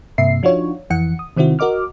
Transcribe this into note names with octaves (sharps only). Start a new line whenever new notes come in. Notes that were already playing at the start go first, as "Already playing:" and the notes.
G2 C3 A#3 E5 C7
F3 D4 D#4 F4 F#4 C#5
F2 E3 F#5 C#7
D#6
C3 D#3 C4 E4 F#4
F#4 A#4 D#5 D6 F6